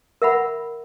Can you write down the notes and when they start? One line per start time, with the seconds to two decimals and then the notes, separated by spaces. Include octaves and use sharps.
0.22 A#4 E5 F#5 B5